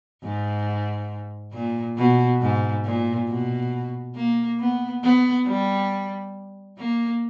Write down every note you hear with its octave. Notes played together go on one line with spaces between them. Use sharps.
G#2
A#2
B2
G#2
A#2
B2
A#3
B3
B3
G3
A#3